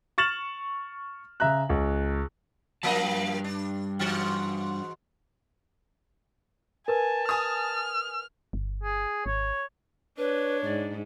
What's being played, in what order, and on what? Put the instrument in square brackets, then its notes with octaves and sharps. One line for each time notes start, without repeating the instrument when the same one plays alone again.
[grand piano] C#6 F6 A6 E7 F#7
C#3 E5 A#5 F#6
C#2
[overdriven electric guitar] G2 A5 [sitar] F3 A#3 D#5
[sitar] D4
G#2 E3 F#4
[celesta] A#4 B4 [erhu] G#5 [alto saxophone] A5
[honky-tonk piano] G#5 D#6 [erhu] F6
[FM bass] G1
[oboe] G#4
[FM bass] G#1 [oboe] C#5
[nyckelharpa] D4 [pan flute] B4 [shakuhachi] C#5
[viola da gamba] G#2 [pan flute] D5